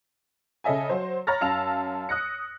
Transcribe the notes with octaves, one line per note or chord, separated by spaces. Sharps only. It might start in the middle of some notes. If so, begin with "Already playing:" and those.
C#3 A4 D#5 E5 G#5
F#3 C5
C#5 A#5 B5 F6 A6 A#6
F#2 F5 A5 E6 F7
D#6 F#6 A#6 C#7